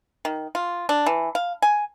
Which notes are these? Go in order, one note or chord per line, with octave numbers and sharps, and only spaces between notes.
D#3
F4
D4
E3
F5
G#5